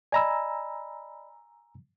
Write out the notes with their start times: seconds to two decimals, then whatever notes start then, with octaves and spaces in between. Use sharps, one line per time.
0.12 D5 D#5 G#5 A#5 B5 E6